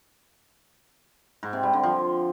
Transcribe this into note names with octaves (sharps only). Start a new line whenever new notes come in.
G#2
C3
G3
D3
F3